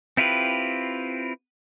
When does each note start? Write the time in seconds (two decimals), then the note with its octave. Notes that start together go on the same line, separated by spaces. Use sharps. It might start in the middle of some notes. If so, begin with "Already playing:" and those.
0.17 C4 E4 F4 G4 B4